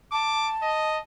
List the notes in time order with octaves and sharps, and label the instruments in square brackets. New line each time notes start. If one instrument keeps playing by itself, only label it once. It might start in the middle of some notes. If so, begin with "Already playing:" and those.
[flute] A5 [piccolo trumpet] D6
[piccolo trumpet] D#5